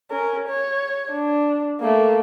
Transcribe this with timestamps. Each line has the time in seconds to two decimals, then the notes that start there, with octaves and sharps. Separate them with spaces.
0.11 C#4 A#4
0.48 C#5
1.11 D4
1.81 A3 A#3